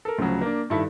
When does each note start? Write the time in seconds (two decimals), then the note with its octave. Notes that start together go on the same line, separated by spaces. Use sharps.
0.05 A4 A#4
0.18 D2 C#3 F3 F#3
0.41 A#3 D4
0.70 G2 D#3 E4 A4 B5